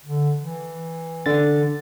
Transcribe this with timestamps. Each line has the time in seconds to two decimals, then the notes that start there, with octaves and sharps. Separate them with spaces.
0.05 D3
0.39 E3
1.26 D3 A6